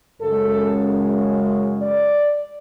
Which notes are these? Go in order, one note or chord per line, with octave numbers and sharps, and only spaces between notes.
F#2 C#3 G#3 A4
D5